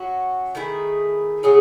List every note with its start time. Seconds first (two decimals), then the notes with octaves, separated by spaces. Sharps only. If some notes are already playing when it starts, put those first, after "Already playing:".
Already playing: F#3 C#4 F#4
0.55 D#3 A3 E4 G#4
1.43 C#3 F#3 C#4 G#4